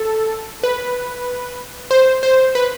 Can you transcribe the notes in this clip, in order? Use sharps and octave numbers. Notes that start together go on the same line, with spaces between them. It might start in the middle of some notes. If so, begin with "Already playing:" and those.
Already playing: A4
B4
C5
C5
B4